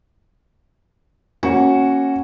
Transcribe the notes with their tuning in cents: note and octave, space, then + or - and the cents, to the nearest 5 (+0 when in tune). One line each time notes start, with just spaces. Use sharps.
A#3 -5 C#4 -15 F#4 +0